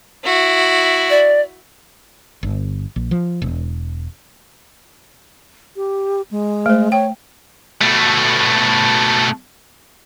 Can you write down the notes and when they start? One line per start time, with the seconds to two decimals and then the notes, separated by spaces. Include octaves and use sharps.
0.24 E4 F#4
1.10 D5
2.43 G1
2.96 A#1
3.11 F3
3.42 E1
5.76 G4
6.31 G#3
6.66 A3 C5
6.92 C#5 G5
7.81 B2 A3